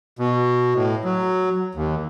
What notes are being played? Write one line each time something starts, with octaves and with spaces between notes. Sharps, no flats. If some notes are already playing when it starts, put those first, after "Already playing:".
B2
A2
F#3
D#2